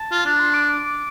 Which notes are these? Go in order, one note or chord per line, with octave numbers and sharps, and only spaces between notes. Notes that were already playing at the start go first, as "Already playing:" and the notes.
Already playing: A5
F4
D4
C6
D6
D6